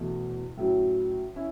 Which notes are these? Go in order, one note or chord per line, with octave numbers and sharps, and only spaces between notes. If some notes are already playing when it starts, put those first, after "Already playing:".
Already playing: E2 B2 A3
A2 F#3 C#4 F#4
C#4 E4